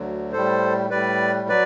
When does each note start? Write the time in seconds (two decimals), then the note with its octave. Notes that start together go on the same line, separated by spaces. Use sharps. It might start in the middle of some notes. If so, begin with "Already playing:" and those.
Already playing: D2 D3 F#3
0.33 A2 G3 A4 C5
0.90 A2 G3 B4 D5
1.49 F#3 B4 D5